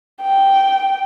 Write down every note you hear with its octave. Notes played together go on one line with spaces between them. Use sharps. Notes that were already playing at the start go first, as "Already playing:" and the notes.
G5